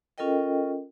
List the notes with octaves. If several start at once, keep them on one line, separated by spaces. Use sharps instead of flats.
C#4 F4 A4 A#4 D#5 G5